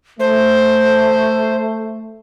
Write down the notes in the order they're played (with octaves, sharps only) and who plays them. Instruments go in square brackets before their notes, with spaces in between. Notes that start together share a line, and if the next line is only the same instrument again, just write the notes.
[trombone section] A3 [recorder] C5